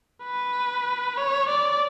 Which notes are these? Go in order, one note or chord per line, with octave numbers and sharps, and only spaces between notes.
B4
C#5
D5